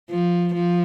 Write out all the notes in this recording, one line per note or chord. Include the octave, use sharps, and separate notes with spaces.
F3
F3